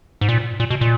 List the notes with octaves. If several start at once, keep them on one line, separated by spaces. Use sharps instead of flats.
G#2
A#2
A#2
B2
A#2